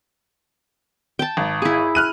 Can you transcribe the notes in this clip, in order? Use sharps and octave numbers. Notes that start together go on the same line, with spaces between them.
G5 A5
G#1
E4 G#4
F6 F#6 D#7